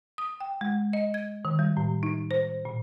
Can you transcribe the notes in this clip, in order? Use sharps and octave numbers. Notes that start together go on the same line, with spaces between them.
D#6
G5
G#3
D#5
G#6
D#3
G3
A2
D#4
C5
A#2